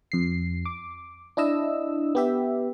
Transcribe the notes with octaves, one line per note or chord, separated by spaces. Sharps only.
F2 C7
D6
D4 E4 D#5 E6
B3 G4 E5